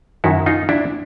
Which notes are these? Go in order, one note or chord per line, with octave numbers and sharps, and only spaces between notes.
F#2 D#3 E4 F#4
D#4 F4
D4 E4